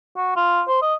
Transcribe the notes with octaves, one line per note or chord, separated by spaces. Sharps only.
F#4
F4
C5
D#5